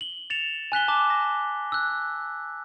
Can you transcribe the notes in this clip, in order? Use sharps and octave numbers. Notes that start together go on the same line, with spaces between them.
F#7 G7
A6 C#7 E7 F7
G#5 F#6 B6 G7
A5 D6
A#6
E6 F#6